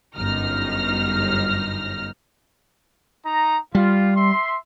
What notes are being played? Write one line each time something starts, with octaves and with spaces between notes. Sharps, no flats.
G1 F#2 D#4 F6 A#6
D#4 A#5
G3 F4
E5 C6